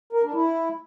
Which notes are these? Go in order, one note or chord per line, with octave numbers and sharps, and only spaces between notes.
A#4
D4
E4